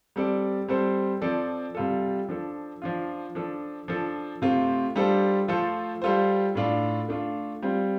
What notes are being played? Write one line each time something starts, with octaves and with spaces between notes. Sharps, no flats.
G3 C4 A4 D5
G3 C4 A4 C5
F3 C4 A4 D5
C3 G3 F4 A4
F3 D4 A4
F3 D4 F4
F3 D4 A4
F3 D4 A4
C3 A3 C4 F4 C5
G3 D4 F4 A4 C5
F3 A3 F4 A4 C5
G3 F4 A4 C5
A2 A3 D4 F4 D5
A3 D4 F4
G3 C4 F4